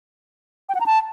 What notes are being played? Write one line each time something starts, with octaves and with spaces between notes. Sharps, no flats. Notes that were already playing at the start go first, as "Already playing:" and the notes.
G5
F#5
A#5
A5